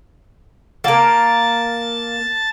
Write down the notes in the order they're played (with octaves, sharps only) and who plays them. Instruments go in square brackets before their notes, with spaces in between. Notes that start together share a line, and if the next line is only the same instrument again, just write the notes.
[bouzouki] A#3 A#4 [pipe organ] A5 A6